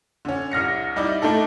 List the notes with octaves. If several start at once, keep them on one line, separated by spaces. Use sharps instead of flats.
D3 C#4
C2 F6 A#6 C#7
G3 D#4 E4 D5
A3 D4 D#4 A4